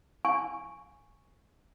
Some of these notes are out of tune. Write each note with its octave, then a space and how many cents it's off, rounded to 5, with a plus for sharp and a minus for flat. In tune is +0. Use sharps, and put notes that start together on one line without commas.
G#5 +0 C#6 +0